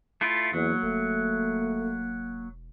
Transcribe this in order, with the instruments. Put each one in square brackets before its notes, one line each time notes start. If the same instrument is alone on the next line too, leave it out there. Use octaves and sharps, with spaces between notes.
[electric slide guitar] A3 E4 F4
[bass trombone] E2 [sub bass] E3 [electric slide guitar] F#3 [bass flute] A#3
[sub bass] E1 [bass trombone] A3